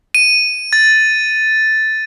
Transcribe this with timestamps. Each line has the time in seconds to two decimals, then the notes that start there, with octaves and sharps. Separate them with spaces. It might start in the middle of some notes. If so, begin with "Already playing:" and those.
0.15 D#7
0.73 A6